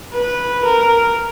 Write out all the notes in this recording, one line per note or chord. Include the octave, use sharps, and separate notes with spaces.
B4
A#4